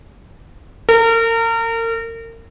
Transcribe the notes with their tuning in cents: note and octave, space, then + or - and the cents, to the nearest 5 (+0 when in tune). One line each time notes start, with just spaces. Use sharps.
A#4 -35